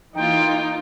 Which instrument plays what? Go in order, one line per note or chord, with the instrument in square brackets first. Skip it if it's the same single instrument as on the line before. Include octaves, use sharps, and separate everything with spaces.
[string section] E3 A#3 F4 [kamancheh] D#4 [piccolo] G5